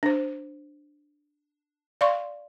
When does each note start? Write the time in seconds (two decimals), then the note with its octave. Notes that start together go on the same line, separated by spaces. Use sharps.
0.03 D4 C5
2.01 D5 F5 C6 C#6